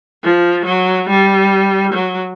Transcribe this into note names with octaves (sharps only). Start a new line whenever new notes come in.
F3
F#3
G3
F#3